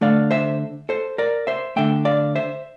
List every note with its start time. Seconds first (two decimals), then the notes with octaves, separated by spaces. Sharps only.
0.01 D3 A3 D5 F5
0.31 C5 E5
0.89 A4 C5
1.18 A#4 D5
1.47 C5 E5
1.76 D3 A3 E5 G5
2.05 D5 F5
2.35 C5 E5